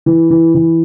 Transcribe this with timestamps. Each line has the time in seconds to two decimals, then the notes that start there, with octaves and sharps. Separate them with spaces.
0.06 E3
0.31 E3
0.55 E3